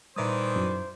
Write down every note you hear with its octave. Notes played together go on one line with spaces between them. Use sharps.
A#2 D#3 E3 G3 C5 D5 D#6
F#2 E4